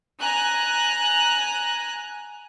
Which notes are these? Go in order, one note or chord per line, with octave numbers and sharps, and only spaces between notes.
G#5 A#5 F#6